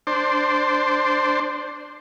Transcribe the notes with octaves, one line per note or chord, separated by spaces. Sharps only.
D4 C5